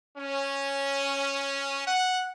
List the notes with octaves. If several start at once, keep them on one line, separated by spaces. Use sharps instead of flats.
C#4
F#5